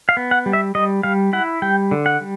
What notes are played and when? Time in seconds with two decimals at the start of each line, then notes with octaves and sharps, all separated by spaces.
0.09 F5
0.17 B3
0.31 F#5
0.46 G3
0.53 E5
0.75 G3 D#5
1.03 G3 F5
1.33 E4 F#5
1.62 G3 G5
1.91 D3
2.06 F#5
2.21 G3